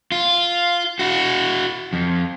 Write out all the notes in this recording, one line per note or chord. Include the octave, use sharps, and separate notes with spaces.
F4
E4 F#4
F2